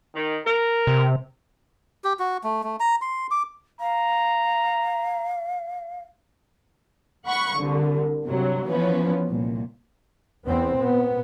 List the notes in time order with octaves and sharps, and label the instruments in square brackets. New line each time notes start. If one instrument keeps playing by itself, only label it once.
[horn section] D#3
A#4
[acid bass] C3
[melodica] G4
F#4
A3
A3
A#5
C6
D6
[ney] F5 [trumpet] A#5
[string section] F#5 B5 C#6
C2 D3
G2 C3 F#3
E3 F3 B3 C#4 B4
C2 A#2
[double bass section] E2 B3 C4
A#2 B3